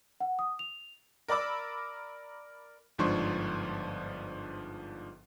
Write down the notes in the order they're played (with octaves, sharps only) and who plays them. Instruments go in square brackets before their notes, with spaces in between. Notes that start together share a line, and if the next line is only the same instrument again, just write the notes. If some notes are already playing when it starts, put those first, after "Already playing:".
[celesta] F#5
D#6
F7
[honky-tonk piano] A#4 D5 B5 D6 E6
[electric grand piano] G1 G#2 F3 D4 C6 C#6